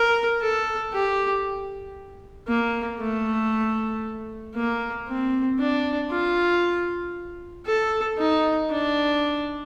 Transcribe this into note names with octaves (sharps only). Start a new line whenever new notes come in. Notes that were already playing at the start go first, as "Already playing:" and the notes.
Already playing: A#4
A4
G4
A#3
A3
A#3
C4
D4
F4
A4
D#4
D4